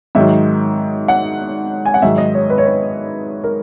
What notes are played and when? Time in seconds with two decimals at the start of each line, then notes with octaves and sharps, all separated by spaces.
0.15 G#2 D#3 F#3 E5
1.08 F#5
1.85 G#5
1.94 F#5
2.02 G#2 D#3 F#3 E5
2.18 D#5
2.34 C#5
2.50 B4
2.58 C#5
2.65 B4
3.44 A#4